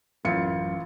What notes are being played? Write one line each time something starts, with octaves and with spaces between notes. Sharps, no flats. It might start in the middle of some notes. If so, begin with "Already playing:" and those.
A1 F#2 F4 C#7